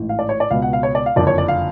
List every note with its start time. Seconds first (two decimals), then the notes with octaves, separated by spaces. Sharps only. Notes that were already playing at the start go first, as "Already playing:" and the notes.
Already playing: A1 G#2
0.09 F5
0.19 D5
0.29 C#5
0.40 D5
0.51 C#2 B2 F5
0.62 F#5
0.73 F5
0.83 C#5
0.95 D5
1.06 F5
1.16 F#1 F2 D3 D5
1.27 C#5
1.38 D5
1.48 F5